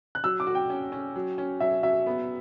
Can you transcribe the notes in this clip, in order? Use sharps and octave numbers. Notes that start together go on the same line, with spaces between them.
F#6
F#3 E6
D6
F#4
G5
C#4
C#4
F#3
C#4
F#3 E5
F#3 E5
B3